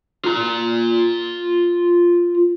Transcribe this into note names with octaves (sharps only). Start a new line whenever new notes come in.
F4 A#5